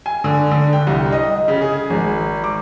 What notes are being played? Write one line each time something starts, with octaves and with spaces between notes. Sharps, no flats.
G#5
D3
D3
G5
C2
D#5
C#3
G#4
G#1
D6